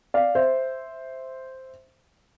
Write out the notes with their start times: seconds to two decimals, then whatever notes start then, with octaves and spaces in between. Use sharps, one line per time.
0.14 D5 F5
0.35 C5 E5